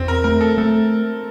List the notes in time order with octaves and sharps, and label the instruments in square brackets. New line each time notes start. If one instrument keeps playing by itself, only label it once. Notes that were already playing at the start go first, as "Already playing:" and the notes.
Already playing: [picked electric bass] E2 [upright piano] C4
[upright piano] A#4
[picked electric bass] A3 [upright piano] A#4
[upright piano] A4
[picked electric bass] A3 [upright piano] A4